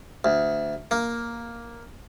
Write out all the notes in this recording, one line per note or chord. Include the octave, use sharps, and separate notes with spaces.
D2
A#3